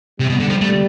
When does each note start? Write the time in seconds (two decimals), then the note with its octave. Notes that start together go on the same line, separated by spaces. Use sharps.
0.20 C3 G3
0.29 B2
0.40 D3
0.50 F3
0.61 A3